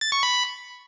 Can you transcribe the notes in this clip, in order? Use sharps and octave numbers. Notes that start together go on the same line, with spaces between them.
A6
C#6
B5